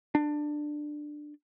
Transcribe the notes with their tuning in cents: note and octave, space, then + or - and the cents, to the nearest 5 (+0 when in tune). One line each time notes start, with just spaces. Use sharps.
D4 +15